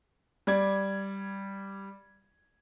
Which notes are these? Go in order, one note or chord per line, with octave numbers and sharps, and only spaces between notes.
G3 D5 G#6